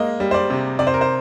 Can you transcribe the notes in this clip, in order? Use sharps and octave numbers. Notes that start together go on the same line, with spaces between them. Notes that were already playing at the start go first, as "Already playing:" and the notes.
Already playing: G#3 A#3 D#5
G3
C5
D5
C3
C3 D5
C5
A#4
C5